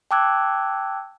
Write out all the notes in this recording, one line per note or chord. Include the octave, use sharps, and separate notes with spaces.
G5 A5 D6 E6 F#6 G#6